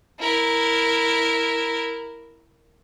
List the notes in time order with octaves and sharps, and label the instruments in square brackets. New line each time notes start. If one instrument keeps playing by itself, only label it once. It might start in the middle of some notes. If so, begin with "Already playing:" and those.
[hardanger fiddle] E4 A#4